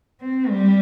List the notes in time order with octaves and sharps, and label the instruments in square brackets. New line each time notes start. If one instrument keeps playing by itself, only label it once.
[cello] C4
G3